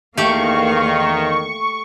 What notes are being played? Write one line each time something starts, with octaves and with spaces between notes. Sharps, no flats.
E2 D#3 A3 A#3 G4 F5 C#6